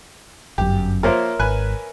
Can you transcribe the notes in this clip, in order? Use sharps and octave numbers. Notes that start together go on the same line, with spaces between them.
G1 F#2 G4
F3 A#3 A#4 C5 C#5 E5
G#1 B4 G#5 F#6